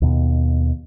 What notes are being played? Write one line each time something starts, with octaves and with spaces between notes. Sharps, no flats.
D#2 B2